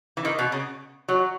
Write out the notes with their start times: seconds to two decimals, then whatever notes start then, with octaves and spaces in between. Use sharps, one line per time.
0.17 E3
0.25 D#3
0.39 B2
0.52 C#3
1.08 F#3